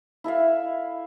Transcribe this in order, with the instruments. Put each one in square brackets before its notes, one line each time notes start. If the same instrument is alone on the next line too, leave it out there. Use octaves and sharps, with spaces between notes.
[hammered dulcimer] E4 A4 E5 F5